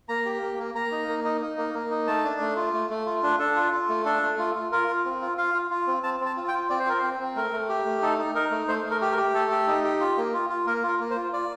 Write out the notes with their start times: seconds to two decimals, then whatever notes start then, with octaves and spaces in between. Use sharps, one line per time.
0.09 A#3 A#5
0.25 G4
0.42 A#3
0.59 A#3
0.74 A#3 A#5
0.91 D#4
1.08 A#3
1.24 D#4
1.41 D#4
1.57 A#3
1.74 A#3
1.90 D#4
2.07 A3 A5
2.24 D4
2.40 A3
2.56 F4
2.73 A3
2.90 A3
3.06 F4
3.23 D4
3.39 D4 A4
3.56 F4
3.72 F4
3.89 A3
4.05 D4 A4
4.22 A3
4.39 F4
4.55 F4
4.72 F4 A#4
4.88 F4
5.05 C4
5.22 F4
5.38 F4 F5
5.54 F4
5.71 F4
5.87 C4
6.03 C4 A5
6.20 C4
6.26 A5
6.37 F4
6.48 G5
6.54 F4
6.70 C4 D5
6.80 C5
6.86 F4 A#4
6.98 C4 C5
7.19 C4
7.35 A3 A#4
7.52 A3
7.69 G4
7.85 A3
8.02 D#4 A4
8.18 D#4
8.35 D#4 A#4
8.51 A3
8.68 A3 C5
8.84 A3
8.90 A#4
9.02 G4
9.12 A#4
9.18 G4
9.34 A3 A4
9.51 G4
9.67 D#4
9.84 G4
10.00 F4
10.17 A#3
10.33 F4
10.50 F4
10.66 A#3 A#4
10.83 F4
10.88 A#4
11.00 A#3
11.10 C5
11.16 F4
11.33 F4 D5